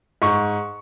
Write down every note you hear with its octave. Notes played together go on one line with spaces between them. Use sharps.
G#2 C#6